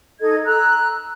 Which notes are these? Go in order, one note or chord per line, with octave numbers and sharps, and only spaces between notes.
D#4 A4 D#5 G#6
A#5 E6 F#6